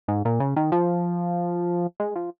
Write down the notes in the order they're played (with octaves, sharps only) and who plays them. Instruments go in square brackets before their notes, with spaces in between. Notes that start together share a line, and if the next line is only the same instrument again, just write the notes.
[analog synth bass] G#2
A#2
C#3
D#3
F3
G#3
F3